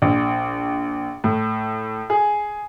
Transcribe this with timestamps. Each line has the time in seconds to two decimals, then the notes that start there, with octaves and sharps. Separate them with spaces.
0.02 A#1
1.24 A2
2.10 G#4